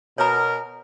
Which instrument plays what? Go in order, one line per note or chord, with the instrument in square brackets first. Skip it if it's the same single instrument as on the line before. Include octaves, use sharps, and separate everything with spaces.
[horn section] B2 A#4 [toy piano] C#5 A#5